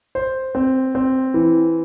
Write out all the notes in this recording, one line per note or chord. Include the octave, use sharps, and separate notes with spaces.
C5
C4
C4
E3